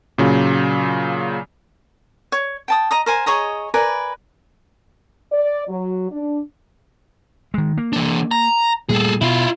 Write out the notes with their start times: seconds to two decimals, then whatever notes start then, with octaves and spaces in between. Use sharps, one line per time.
0.18 A#2 C#3 F#3
2.32 C#5
2.68 G5 A5 D#6
2.91 D#5 A#5 D#6
3.06 A#4 C5 G#5
3.26 G#4 C#5 D#5 A#5
3.74 A#4 B4 D5 G#5
5.31 D5
5.68 F#3
6.11 D4
7.54 D#3 G#3
7.78 A#3
7.93 E3 D4
8.31 A#5
8.89 A#2 G3 A3 G#4 A4
9.21 B2 E4 F4